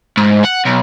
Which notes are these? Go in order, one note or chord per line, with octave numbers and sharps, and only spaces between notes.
G#2
F#5
B1